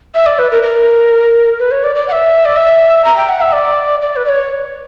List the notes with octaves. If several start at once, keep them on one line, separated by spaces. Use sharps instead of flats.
E5
D5
B4
A#4
A#4
B4
C#5
D5
D5
F#5
E5
D5
E5
A#5
G5
F#5
E5
D5
D5
B4
D5
C#5